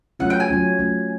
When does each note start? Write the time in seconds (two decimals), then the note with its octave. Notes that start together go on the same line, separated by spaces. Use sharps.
0.20 F#3 A3 C#4 F4 F#5
0.30 G5
0.40 G#5
0.49 F#3 A3 C#4 F4
0.79 F#3 A3 C#4 F4